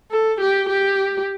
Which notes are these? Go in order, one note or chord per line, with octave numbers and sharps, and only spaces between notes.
A4
G4
G4